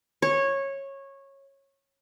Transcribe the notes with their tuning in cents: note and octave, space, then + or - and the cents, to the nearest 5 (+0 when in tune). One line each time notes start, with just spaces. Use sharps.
C#5 -15